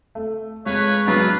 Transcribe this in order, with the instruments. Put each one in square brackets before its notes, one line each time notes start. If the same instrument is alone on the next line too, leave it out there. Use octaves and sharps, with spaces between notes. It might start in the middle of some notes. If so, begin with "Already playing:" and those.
[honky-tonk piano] A3
[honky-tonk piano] F2 [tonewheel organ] G#3 F5 [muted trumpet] B4 [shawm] C#5
[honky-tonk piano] F#3 B3 D4 [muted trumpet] F4 [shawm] B4